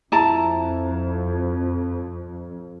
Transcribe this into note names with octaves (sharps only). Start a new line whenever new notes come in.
F2 E4 A5 A#5